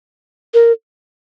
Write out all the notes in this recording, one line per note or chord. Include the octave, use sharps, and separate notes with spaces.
A#4